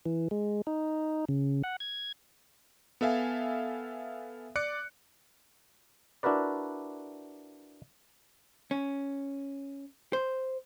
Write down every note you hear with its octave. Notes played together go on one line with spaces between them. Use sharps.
E3
G#3
D#4
C#3
F#5
G#6
B3 A4 E5 F5 G#5
D5 D6 F#6 C#7
D4 E4 F#4 A#4 B4 D5
C#4
C5